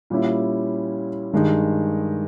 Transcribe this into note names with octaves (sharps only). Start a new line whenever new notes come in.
A#2 G3 C#4 E4
G2 D#3 G#3 D#4